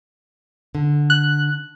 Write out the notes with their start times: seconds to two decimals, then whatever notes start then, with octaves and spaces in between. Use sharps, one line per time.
0.75 D3
1.10 F#6